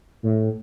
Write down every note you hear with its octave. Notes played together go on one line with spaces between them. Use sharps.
A2